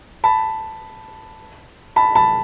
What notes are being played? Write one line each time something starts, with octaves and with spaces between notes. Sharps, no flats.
A5 B5
A5 B5
A5 B5